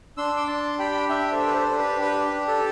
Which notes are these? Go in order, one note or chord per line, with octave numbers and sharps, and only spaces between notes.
D4 C6 E6
D6
D4 A5 C6
G4 G5 B5
D4 E5 G5
A4 C5
G4
B4
A4 C5
D4
B4
G4 B4
D4
A4